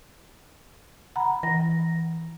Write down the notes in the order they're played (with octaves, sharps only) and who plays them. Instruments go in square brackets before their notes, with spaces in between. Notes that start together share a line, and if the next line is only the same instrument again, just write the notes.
[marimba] F#5 A#5 B5
[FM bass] E3 [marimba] A#6